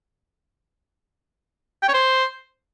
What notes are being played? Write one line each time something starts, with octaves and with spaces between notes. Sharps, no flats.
G5
C#5
C5